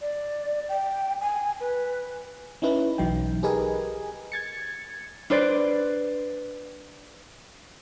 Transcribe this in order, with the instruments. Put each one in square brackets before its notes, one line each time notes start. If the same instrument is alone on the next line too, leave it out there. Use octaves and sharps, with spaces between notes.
[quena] D5
G5
G#5
B4
[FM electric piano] C#4 D#4 E4 B4
B1 E3 F#3 D#4 G5
G4 G#4 A#4 B4 D#5 G#5
G#6 A6 C#7
[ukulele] D4 B4 C5 D5